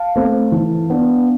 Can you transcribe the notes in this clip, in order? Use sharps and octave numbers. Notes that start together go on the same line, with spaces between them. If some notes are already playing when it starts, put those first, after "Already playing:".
Already playing: F5 A5
A3 C4
E3
B3 D4